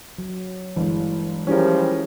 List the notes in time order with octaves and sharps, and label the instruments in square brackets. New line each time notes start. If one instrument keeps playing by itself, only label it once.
[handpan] F#3
[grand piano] G1 [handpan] E3 G#3
[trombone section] F3 G3 [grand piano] C#4 G4 A#4 [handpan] E4 G#4